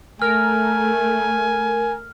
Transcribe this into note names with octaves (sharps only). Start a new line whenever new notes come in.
A3 A#4 G#5 F6